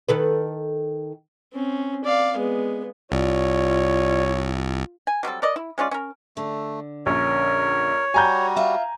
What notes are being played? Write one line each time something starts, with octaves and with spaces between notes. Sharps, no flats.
D#3 A4 B4
C4 C#4
D5 F5
G#3 B3
C2 F4 C#5 D5
G#5
F#3 G3 C4 A4
A#4 D5 D#5
E4
G#3 C#4 F4 D5
C#4 A#4
D3 A3
A#1 C#4 A#4 C#5
G3 F#4 G#5 A#5 G6
F4 E5